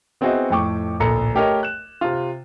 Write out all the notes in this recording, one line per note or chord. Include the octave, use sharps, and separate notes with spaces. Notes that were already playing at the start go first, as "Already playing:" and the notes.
B3 C4 E4 F#4 G#4 D#5
F2 A2 G5 C#6 D6
D1 A#1 A4 A#5 C#7
A3 G4 A#4 C#5 D#5
F#6 E7
C3 F4